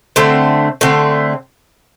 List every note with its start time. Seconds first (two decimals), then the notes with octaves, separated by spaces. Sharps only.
0.16 D3 A3 C4
0.81 D3 A3 C4